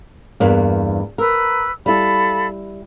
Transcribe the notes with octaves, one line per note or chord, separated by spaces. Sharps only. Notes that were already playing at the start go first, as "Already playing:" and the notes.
E2 G2 A#3
A#4 B4 E6
G3 E4 A4 F5 B5